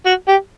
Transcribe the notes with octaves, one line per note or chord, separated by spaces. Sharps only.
F#4
G4